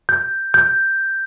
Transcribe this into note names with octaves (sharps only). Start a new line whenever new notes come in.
G6
G6